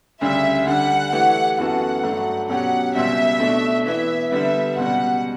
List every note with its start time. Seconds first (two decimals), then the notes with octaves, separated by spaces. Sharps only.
0.21 D2 C#3 G3 D4 E5
0.67 D3 G3 D4 F#5
1.12 E3 A3 E4 G4
1.57 F#2 E3 B3 F#4 A4 F#5
2.03 G2 F#3 A3 D4
2.48 B2 F#3 C#4 G4 F#5
2.95 C#2 B2 G3 E5
3.40 B2 A3 D4
3.86 E3 B3 E4 E5
4.31 D3 G3 B3 E5
4.76 C#2 B2 G3 F#5